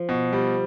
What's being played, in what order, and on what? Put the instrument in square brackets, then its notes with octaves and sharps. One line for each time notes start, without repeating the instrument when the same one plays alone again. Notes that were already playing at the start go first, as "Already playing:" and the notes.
Already playing: [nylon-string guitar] F3
[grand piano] B2
G3